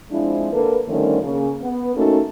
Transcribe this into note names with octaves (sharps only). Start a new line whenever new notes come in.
F3 G#3 C4 D4 E4
D3 A#3 A4 B4
D3 D#3 F3 G3 A3 C#4
C#3 A#3
B3
A3 A#3 C#4 D#4 F#4 A4